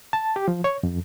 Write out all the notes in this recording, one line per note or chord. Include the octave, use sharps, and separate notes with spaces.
A5
G4
F3
C#5
F2